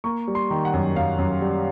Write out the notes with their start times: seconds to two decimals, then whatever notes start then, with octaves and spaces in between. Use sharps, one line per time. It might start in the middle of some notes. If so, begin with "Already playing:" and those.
0.04 A#3 C#6
0.28 G3
0.35 C6
0.51 D#3
0.65 F#5
0.74 F#2
0.96 F#2 F5
1.18 F#2
1.42 G3